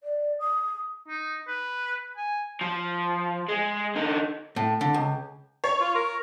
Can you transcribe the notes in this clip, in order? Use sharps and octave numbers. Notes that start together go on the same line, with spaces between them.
D5
D#6
D#4
B4
G#5
F3
G#3
D3 D#4
A2
D3
C#2
C#5
F4
A#4